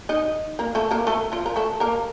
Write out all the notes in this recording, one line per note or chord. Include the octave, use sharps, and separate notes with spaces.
D#4 D#5
A#3 A#4
A3 A4
A#3 A#4
A3 A4
F3 F4
A#4
A3 A4
A#3 A#4